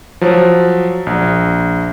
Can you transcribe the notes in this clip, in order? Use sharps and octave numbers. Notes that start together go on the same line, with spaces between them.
F3 F#3
A#1